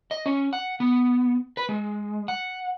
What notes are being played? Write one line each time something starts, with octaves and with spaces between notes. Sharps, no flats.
D#5
C#4
F#5
B3
B4
G#3
F#5